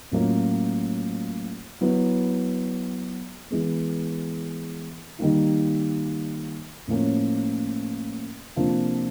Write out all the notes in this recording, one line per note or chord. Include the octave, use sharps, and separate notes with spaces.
A2 F#3 A#3 C#4 F4
F#3 B3 E4
E3 G#3 B3
D#3 G3 A#3 D#4
A2 F3 A#3 C#4
C3 F3 A#3 D4 F4